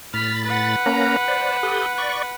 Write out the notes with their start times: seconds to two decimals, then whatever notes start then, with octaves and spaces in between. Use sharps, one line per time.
0.14 A2 B5 F6 A6 B6
0.45 B4 F#5
0.86 A#3 C#4 A#5
1.28 C5 D5
1.63 G4 A4 D#6
1.98 D5 C#6